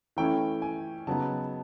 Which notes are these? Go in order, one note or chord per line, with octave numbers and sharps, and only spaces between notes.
E3 A3 C#4 E4 G5
G#5
C#3 F#3 B3 D#4 A5